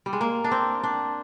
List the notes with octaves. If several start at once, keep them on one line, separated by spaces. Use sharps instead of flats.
G3
G#3
A#3
D4
C4
D4